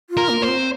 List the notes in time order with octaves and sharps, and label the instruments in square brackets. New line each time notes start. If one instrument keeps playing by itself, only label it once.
[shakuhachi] F4
[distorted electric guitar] A#4
[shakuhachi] A#3
[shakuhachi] A#3 [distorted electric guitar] C5
[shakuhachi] C4